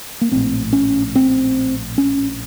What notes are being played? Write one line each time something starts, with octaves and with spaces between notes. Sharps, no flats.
A#3
A#1 A2 C4
C#4
C4
C#4